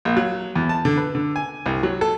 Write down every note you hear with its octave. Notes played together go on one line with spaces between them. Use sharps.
A#1
F#3
E2
A5
D3
B4
D3
G#5
C2
F#3
A4